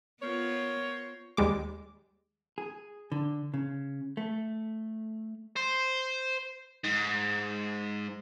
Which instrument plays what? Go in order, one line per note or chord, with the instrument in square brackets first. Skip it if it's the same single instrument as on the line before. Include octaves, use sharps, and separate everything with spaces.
[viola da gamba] B3 F4 [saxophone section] A#4 C5 C#5
[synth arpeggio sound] D#2 G3 G#3 D6
[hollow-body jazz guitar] G#4
D3
C#3
A3
[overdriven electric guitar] C5
G#2